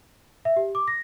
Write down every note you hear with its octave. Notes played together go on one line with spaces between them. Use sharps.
E5
G4
D6
A#6